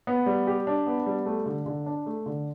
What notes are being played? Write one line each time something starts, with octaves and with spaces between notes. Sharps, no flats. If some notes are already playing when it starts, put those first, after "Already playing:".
B3
G3
G4
D4
B3
G3
A3
D3
D3
D4
A3
D3